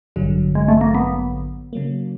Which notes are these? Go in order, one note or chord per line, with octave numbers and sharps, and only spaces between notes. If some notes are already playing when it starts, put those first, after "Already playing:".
A1 G2 D3 F#3
G#3
A3
A#3
B3
C#3 F#3 A#3